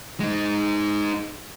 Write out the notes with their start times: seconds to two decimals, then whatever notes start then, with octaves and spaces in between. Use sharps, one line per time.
0.20 G#3 D#4